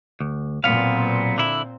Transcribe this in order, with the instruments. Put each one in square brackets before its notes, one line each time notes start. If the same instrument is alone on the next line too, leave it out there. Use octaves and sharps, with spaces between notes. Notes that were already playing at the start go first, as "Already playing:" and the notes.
[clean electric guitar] D2
[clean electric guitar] B1 B3 F5 [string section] A#2 C4
[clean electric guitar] D3 E4